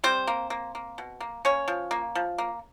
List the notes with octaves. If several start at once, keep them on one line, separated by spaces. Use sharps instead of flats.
G3 C4 C5
A#3
A#3
A#3
B2
A#3
A#3 C#4 C#5
F3
A#3
F3
A#3